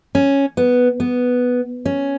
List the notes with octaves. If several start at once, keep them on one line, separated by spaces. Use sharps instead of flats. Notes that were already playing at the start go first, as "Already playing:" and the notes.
C#4
B3
B3
C#4